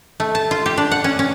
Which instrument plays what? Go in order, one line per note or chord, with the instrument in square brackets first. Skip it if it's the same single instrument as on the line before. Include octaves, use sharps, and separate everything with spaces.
[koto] A3
A5
F4
G4
D4
F#5
C#4
C#4